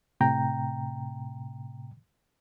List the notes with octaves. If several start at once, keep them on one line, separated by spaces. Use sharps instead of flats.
A2 C3 G5 A#5